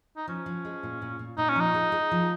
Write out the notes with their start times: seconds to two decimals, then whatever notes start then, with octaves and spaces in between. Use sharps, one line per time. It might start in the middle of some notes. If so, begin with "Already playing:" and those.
0.17 D#4
0.27 F3 C#4
0.46 F3
0.65 G#3
0.83 A#2
1.02 A#2
1.19 A#2
1.37 A#2 D#4
1.49 C#4
1.56 F3 D#4
1.74 G#3
1.92 G#3
2.11 F3